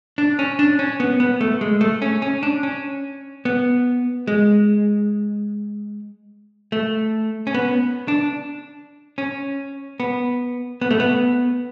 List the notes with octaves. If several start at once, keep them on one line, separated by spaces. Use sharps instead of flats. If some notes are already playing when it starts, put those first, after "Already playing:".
D4
C#4
D4
C#4
B3
B3
A3
G#3
A3
C#4
C#4
D4
C#4
B3
G#3
A3
C#4
B3
D4
C#4
B3
B3
A3
B3